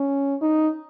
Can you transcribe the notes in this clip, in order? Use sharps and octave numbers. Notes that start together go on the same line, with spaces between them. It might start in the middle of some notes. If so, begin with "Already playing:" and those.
Already playing: C#4
D#4